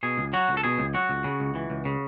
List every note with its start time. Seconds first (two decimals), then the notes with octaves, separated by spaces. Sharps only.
0.03 B2 G#4
0.18 C#2
0.33 F#3 F#4
0.49 C#2
0.57 A4
0.63 B2 G#4
0.79 C#2
0.94 F#3 F#4
1.09 C#2
1.24 C#3
1.40 C#2
1.55 E3
1.70 C#2
1.85 C#3